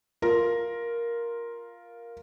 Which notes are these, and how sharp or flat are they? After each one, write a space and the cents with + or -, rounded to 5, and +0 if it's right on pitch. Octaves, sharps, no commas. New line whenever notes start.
F4 +0 A#4 +5